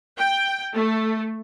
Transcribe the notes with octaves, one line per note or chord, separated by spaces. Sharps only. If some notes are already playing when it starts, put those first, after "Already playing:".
G5
A3